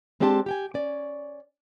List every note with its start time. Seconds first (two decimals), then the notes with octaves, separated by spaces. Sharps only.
0.20 G#3 C4 D4 G4 G5 A5
0.46 G4 G5 G#5
0.74 C#4 D5